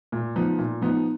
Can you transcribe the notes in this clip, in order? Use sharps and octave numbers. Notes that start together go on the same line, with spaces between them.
A#2
F3 B3 D#4
A#2
F3 B3 D#4